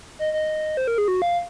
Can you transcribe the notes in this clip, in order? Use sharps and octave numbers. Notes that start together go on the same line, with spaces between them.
D#5
D#5
C5
A#4
G#4
F#4
F5